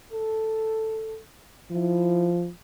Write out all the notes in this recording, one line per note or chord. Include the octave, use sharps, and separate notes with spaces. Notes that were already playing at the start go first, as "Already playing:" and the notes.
A4
F3 E4